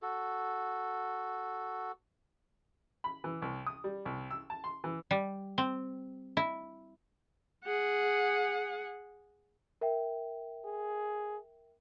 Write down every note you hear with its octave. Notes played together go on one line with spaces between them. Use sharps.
F#4 A4
B5
E3
C2
D#6
G3
C2
E6
A5
C6
E3
G3
C4
E4
G#4 F#5
A#4 E5 G5
G#4